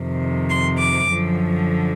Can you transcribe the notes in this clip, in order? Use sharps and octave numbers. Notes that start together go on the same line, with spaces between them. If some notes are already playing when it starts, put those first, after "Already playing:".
Already playing: F2 C3 D#3
C6
D6
F#2 D3 F3